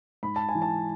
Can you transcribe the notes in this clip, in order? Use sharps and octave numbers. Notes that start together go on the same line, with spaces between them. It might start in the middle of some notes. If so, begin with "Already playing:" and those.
G#2 B5
A5
G#5
E3
A5